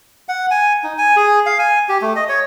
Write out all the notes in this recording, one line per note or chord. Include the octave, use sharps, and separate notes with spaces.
F#5
G#5
D#4
G#5
G#4
F5
G#5
G4
A3
D#5
C#5